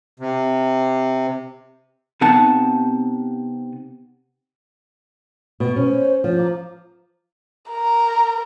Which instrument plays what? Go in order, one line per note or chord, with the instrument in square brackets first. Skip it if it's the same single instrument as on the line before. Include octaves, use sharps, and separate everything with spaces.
[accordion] C3
[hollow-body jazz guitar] C3 B3 D#4 F#5 A5
[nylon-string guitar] B2
[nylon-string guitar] C#4 [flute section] C5 C#5
[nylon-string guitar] F3
[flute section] F5 A#5 D6
[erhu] A#4